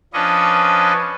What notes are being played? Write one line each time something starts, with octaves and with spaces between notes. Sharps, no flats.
F3 C#4 D4 B4 D#5 C#6